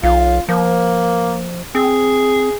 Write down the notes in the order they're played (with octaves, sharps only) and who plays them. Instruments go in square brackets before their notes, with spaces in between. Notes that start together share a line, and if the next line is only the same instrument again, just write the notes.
[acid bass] B1 [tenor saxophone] F4
[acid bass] F3 [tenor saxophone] A#3
[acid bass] C4 [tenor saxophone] G#4